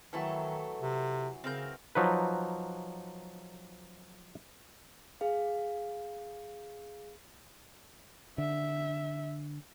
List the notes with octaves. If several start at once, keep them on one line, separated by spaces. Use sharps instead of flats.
D#3 E3 F#3 A3 E4 A4
C3
C#3 C4 A#4 G6
F3 F#3 D#4 B4
G#4 F5
D3 E5